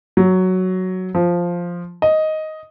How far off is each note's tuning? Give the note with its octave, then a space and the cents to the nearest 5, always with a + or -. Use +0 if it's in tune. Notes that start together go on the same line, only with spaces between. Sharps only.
F#3 +5
F3 +0
D#5 +5